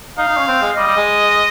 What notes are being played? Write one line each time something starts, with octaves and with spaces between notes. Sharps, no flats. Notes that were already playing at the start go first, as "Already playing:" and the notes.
D#4 F5
D#4
C#4
C4
G#3
G3 D#5
G3
G#3